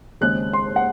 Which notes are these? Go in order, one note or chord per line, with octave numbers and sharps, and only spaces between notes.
D#2 C#3 G#3 C4 F#6
C6
F#5